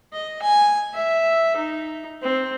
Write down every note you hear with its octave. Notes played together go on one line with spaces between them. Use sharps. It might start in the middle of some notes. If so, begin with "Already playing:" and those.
D#5
G#5
E5
D#4
C4